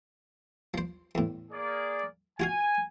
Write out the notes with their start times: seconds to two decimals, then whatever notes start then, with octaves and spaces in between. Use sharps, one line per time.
0.74 F3 C5
1.15 E2 A2
1.51 A#3 G#4 D5
2.40 F4 F#4 F5 G#5